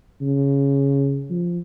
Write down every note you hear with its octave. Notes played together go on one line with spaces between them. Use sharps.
C#3
F3